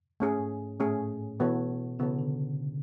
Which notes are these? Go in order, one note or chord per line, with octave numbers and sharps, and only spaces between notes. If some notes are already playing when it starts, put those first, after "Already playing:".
G#2 A3 C#4 G#4
G#2
A2 A3 C#4 G#4
B2 E3 B3 F#4 A4 C#5
C#3 E3 B3 F#4 A4 C#5
D3